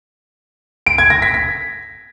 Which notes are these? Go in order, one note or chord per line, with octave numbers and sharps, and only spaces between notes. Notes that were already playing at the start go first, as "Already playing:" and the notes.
D7
G#6
A#6
B6
B6